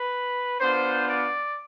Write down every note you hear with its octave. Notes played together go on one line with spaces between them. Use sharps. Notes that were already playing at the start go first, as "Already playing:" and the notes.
Already playing: B4
B3 D4 F4 C5
D5